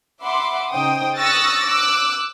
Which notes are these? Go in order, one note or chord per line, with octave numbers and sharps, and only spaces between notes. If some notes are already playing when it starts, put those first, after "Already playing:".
E5 F#5 B5 C6 D6
C#3 D#4 C5 G5 D#6
C#6 D#6 E6 F#6 A6 A#6
D6 E6 F#6